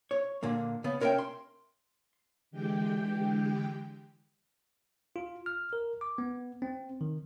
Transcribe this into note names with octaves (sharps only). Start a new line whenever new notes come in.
C#5
A#2 D3 A#3
C#3 B3
C#4 A#4 B4 D#5 E5 G5
C6
D3 E3 G#3 G4 G5
F4
F6
A#4
D6
B3
C4
D#3